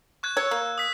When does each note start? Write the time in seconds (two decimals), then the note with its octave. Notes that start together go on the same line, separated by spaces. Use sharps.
0.23 C#6 F#6 G#6
0.37 C#5 E6
0.51 A#3
0.78 D#6 B6